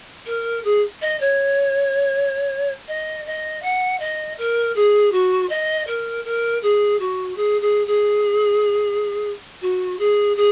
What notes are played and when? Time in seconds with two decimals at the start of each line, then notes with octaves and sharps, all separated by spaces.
0.26 A#4
0.64 G#4
1.02 D#5
1.20 C#5
2.88 D#5
3.26 D#5
3.62 F#5
4.00 D#5
4.38 A#4
4.75 G#4
5.12 F#4
5.49 D#5
5.87 A#4
6.24 A#4
6.63 G#4
6.99 F#4
7.36 G#4
7.61 G#4
7.87 G#4
9.62 F#4
9.99 G#4
10.36 G#4